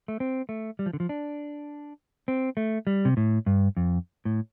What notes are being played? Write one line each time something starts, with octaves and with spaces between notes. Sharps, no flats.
A3
C4
A3
G3
F3
D3
F3
D4
C4
A3
G3
C3
A2
G2
F2
A2